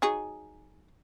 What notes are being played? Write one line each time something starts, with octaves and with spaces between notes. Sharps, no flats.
F#3 D#4 G#4